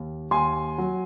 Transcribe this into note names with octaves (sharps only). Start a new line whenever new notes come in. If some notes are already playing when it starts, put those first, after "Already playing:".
Already playing: D#2
D#2 G#5 C6
F#3